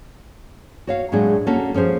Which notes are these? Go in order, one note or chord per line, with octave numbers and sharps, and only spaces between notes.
F#4 C#5 F5
A2 F#3 G#3 D4 G#4
A#3 C#4 F#4 A4
F3 C#4 G#4 C5